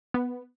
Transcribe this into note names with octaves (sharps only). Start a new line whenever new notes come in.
B3